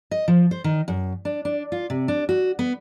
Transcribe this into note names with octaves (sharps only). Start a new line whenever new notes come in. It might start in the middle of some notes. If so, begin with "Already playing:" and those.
D#5
F3
C5
D#3
F#2
D4
D4
F4
C3
D4
F#4
B3